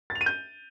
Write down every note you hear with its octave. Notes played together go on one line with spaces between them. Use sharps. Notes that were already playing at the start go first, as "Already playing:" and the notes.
A6
F7
D#7
G6